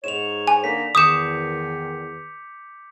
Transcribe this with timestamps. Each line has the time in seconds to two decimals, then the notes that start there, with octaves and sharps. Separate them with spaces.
0.04 G#2 C#5 E7 F7
0.47 G#5
0.64 D3 A#3 D#4 B6
0.95 E2 D#3 D6 D#6 G6 C#7 E7